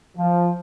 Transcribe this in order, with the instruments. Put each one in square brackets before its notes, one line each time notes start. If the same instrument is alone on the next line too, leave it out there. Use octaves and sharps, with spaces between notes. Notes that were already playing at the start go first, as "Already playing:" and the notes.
[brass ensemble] F3